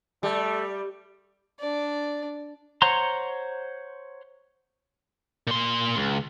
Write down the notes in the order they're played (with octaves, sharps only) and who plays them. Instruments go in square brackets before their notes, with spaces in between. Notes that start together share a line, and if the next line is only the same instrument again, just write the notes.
[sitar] G3 [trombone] A3
[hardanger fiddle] D4 D5
[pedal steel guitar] C5 C#5 F#5 A#5 C6
[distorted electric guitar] A#2 C6
C#2